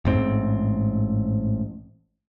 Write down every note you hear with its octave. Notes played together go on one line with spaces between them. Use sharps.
A1 G#2 C4